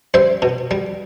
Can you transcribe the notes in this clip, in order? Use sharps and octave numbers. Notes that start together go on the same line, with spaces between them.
G3 C5 E5
B2
G3